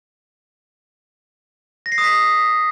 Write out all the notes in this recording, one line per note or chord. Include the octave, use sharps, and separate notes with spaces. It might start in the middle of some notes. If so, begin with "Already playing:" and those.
A#6
C7
D#6
B6